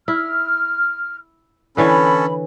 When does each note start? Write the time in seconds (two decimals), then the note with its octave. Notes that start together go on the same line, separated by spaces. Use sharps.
0.08 E4 F6
1.77 D3 E3 C#4 A4 C#5 B5